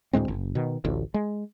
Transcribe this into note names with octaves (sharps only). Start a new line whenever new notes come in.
D2 A2 G#3 C4
F#1
B2 D#3
A1 D2
G#3